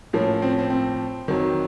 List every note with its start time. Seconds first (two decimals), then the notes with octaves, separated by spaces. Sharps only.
0.13 A2 F3 A#3 C#4
0.42 C4
0.50 C#4
0.59 C4
0.70 C4
1.28 F2 D#3 F#3